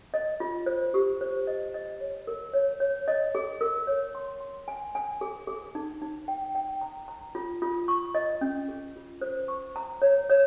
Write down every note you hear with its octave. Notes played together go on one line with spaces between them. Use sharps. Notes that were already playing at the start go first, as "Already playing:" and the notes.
D#5
F4
C5
G4
C5
D#5
D#5
C#5
A#4
C#5
C#5
D#5
G#4
A#4
C#5
C6
C6
G#5
G#5
G#4
G#4
D#4
D#4
G5
G5
A#5
A#5
F4
F4
C#6
D#5
C#4
G#4
F4
C5
C#6
A#5
C#5
C#5